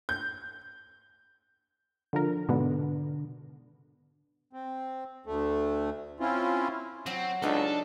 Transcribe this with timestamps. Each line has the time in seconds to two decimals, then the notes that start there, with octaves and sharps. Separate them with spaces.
0.09 G6
2.13 D3 F3 A#4
2.49 G#2 B2 D3 B3
4.53 C4
5.26 D2 A3
6.20 C4 C#4 E4 F4
7.06 F#3 C4 F#4
7.42 C#2 D4 D#4 A4 B4